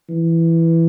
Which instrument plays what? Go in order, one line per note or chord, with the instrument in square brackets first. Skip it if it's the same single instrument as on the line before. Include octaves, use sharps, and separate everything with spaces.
[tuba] E3